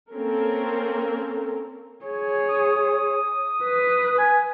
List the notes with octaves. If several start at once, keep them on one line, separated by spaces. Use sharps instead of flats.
A#3 C4 C#4 A4 A#4
G#4 C#5
D#6
B4
G#5